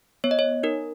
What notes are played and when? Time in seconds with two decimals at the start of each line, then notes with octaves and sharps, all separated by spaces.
0.24 B3 C#5
0.31 D#5
0.39 C#5
0.63 D#4 A#4